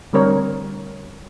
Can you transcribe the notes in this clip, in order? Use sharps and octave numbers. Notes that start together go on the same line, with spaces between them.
D3 G3 C4 A#4 C#5